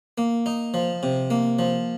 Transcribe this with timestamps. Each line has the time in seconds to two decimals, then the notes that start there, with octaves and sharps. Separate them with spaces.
0.18 A#3
0.46 D#4
0.74 F3
1.03 C3
1.30 A#3
1.59 F3